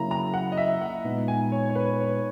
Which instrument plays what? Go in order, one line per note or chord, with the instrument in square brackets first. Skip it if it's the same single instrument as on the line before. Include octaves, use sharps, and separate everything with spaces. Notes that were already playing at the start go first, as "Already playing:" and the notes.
Already playing: [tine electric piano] C#3 F#3 A#3 E4 [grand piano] A#5
[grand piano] A#5
F#5
D#5
E5
F#5
[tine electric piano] A#2 G#3 B3 D#4
[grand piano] G#5
C#5
C#5
B4
C#5